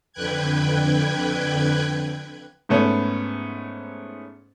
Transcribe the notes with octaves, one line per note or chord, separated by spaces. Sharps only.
F2 D3 B4 G5 F#6 G#6
G#2 A3 B3 C#4